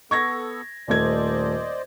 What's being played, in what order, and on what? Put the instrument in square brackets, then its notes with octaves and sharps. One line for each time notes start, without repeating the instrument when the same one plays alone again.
[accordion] B3 A4 [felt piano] C#6 G#6 A#6
[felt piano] D#1 A3 G#6 [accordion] C5 D5 D#5